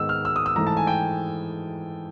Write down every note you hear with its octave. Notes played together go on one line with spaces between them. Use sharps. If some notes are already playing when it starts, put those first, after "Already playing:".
Already playing: G#2 D#3 G#3 B3 E6
F6
E6
D#6
E6
G#2 E3 A3 A#5
A5
G#5
G5